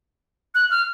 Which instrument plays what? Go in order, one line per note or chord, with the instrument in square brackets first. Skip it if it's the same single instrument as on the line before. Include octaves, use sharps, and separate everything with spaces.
[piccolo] F#6
F6